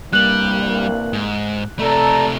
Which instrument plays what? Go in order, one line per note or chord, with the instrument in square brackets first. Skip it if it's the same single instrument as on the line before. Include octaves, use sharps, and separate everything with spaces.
[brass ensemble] C2 G2 A#3 [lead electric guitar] G3 [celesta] F#6 F#7
[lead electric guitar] G#2
[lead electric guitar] C3 A3 [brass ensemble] A4 D5 A#5